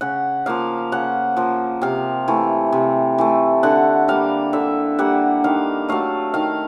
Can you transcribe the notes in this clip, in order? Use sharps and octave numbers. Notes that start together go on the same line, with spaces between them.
C#3 F#5
F3 A#3 F5
C#3 F#5
F3 A#3
C3 F5
E3 A3
C3
E3 A3
D3 F#5
G3 A#3 F5
D3 E5
G3 A#3 F#5
D#3 F5
F#3 A3 F5
D#3 F5